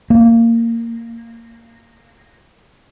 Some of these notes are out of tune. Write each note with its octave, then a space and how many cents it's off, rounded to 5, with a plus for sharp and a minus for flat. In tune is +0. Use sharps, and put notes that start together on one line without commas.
A#3 -15